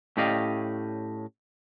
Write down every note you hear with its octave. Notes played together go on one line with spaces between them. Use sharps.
A2 C#4 G4 D5 D#5 F5